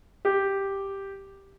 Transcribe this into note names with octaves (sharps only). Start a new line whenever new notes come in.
G4